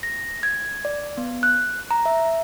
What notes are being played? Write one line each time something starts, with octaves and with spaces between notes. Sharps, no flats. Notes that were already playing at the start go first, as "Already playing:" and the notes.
A#6
G#6
D5
B3
F#6
A#5
E5